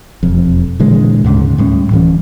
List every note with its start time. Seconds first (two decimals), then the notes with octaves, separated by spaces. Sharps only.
0.23 E1 F2
0.80 A#2 D3 E3 G#3
1.24 D2 G#2 C#3
1.58 A2 G3 G#3 C#4
1.91 D1 E3 C#4